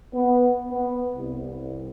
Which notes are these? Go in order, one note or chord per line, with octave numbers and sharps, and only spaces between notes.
B3
B3
C2